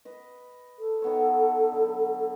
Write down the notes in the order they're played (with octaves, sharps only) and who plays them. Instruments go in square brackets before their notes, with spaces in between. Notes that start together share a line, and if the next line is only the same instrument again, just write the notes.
[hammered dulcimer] B4 D#5
[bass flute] A4
[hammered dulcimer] D#3 B3 C#5
D3 F#3